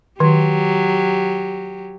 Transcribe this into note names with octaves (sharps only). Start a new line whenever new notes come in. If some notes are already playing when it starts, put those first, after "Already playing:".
D#3 F#3 G4